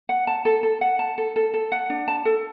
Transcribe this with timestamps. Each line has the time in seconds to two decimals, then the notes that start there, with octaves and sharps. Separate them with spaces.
0.09 F#5
0.27 A5
0.45 A4
0.63 A4
0.81 F#5
0.99 A5
1.18 A4
1.36 A4
1.54 A4
1.72 F#5
1.90 D4
2.08 A5
2.25 A4